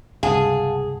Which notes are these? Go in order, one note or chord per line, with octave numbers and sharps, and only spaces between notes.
C#2 G2 C3 G#4 F5 F#5 A5